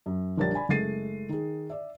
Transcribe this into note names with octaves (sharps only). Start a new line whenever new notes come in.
F#2
A#1 G3 D4 A#4 C#5 A6
D5 G#5 B5
F#1 G#3 A3 A6 C7 D#7
D#3 G#4
D5 E5